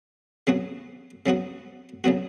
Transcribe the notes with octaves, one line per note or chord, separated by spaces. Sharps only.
C#3 F#3 B3 F#4
C#3 F#3 B3 F#4
C#3 F#3 B3 F#4